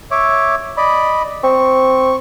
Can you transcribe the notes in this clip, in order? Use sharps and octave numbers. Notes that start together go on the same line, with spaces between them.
C#5 E5 D6
D5 D#5 B5
C4 C#6